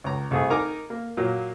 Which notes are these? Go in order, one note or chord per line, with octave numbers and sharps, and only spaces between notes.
C#2 A#5
C2 A3 G#4
D#4 A#4 G#5 A#5 D6
A#3
A#2 F#3 A#3